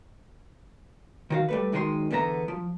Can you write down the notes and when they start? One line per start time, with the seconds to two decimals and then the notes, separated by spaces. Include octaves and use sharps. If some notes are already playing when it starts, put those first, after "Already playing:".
1.30 D#3 F#4 F5
1.49 G3 A3 B4
1.72 F#2 D#3 G#3 D#4 A#4 C6
2.11 E2 D3 B3 E5 A#5
2.48 F3